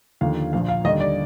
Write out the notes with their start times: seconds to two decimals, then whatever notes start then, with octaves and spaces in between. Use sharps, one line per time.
0.21 D#2 D3 F3 F5
0.53 A#1 A#2 F3 F5
0.68 F5
0.84 D#2 D3 G3 D#5
1.00 D5